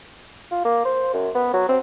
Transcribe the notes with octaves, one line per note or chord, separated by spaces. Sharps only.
F4
A#3
C5
F#2
B3
F#3
C4